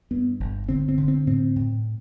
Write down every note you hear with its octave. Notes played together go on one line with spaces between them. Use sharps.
G2 B3
G1
D3 C4
C4
D3
C4
A2 C4
A2